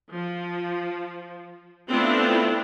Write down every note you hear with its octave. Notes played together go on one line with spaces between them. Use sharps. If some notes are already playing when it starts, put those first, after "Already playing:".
F3
A3 B3 C4 D4 E4 F4